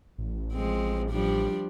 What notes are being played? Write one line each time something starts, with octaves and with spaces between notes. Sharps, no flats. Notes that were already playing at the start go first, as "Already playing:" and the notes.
A1
F3 G#3 C4
F3 G3 D4